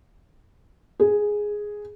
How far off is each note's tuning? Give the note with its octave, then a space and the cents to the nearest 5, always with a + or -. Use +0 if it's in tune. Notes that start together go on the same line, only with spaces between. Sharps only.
G#4 +0